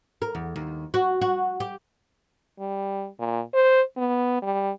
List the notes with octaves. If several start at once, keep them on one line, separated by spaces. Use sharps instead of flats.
A#4
E2
D#2
F#4
F#4
G4
G3
A#2
C5
B3
G3